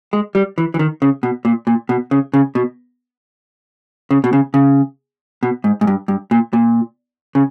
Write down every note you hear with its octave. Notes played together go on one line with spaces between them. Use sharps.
G#3
G3
E3
E3
D#3
C#3
B2
A#2
A#2
B2
C#3
C#3
B2
C#3
B2
C#3
C#3
B2
G#2
G#2
G2
G2
A#2
A#2
C#3